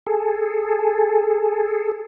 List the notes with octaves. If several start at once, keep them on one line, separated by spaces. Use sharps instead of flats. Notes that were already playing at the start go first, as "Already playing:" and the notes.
G#4 A4